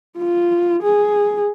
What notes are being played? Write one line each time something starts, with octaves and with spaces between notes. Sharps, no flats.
F4
G#4